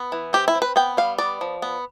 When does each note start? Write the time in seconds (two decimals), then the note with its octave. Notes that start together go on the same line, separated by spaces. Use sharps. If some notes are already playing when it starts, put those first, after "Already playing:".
Already playing: B3
0.12 E3
0.33 C4 G4
0.48 E4
0.55 C4
0.62 B4
0.76 B3 G5
0.97 G3 F5
1.18 B3 D5
1.41 F3
1.62 B3